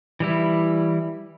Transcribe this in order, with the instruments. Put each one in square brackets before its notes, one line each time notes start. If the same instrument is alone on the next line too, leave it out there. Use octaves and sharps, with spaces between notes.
[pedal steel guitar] E3 G3 E4